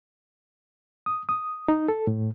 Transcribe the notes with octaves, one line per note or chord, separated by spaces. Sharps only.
D#6
D#6
D#4
A4
A2